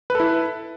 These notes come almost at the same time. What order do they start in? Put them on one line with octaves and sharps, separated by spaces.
B4 A4 E4